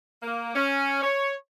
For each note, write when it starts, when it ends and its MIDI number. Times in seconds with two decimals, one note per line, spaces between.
0.23 0.54 58
0.54 1.02 61
1.03 1.32 73